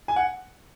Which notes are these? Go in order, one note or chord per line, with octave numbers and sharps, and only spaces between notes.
G#5
F#5